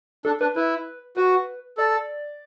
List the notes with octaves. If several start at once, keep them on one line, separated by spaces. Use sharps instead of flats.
D4 A4
D4 B4
E4 B4
F#4 B4
A4 D5